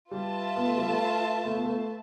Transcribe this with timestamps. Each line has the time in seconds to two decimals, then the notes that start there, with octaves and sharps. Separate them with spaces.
0.11 G3 F4 B4 E5 A5
0.56 B3
0.67 A3
0.77 G3
0.88 A3
1.45 A3
1.55 B3
1.65 A3